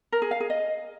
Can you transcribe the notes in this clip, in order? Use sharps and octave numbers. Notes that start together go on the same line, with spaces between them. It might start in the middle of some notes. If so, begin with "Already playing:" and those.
A#4
G#4
F5
G#4
D#5